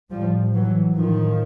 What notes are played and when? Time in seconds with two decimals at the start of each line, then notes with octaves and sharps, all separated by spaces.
0.11 A2 F3 G3
0.54 E3 F#3
0.95 A2 D#3 F3